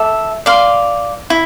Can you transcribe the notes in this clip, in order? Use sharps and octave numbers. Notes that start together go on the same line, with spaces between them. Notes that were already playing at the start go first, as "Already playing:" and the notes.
Already playing: A4 E5 D6
D5 F5 C6
E4